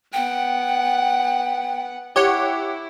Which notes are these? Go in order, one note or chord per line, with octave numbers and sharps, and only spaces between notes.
B3 F#5 G5
E4 G4 C#5 F#5